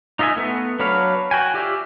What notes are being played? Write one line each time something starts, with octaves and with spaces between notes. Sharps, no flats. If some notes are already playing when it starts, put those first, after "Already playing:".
D#4 F4 D#5 E5 G#5
A3 B3
F#3 D4 B4 C#5 F5
F#4 G5 G#5
F4 G4 D5 E5